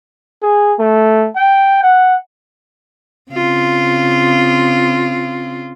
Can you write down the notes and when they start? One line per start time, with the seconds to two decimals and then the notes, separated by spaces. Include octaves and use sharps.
0.42 G#4
0.79 A3
1.36 G5
1.83 F#5
3.31 C#3 C4 F4